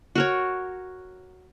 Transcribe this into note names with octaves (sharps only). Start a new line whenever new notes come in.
F#4 A#4 C#5